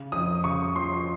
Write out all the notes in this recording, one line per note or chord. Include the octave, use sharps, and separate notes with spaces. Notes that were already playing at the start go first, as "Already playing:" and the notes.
Already playing: C#3
F2 D#6
C#3 C#6
F3 C6